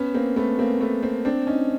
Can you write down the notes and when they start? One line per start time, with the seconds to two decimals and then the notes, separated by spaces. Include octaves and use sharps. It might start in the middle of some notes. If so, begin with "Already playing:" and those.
Already playing: B3 C#4
0.14 A#3 C4
0.36 A3 B3
0.59 A#3 C4
0.81 A3 B3
1.03 A#3 C4
1.25 C4 D4
1.47 C#4 D#4